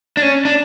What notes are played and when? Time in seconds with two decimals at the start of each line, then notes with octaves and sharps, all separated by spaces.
0.17 D4
0.22 C#4
0.45 D4